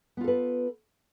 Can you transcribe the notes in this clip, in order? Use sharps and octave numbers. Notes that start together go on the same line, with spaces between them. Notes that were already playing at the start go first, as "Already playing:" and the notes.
B3 F4 A4 B4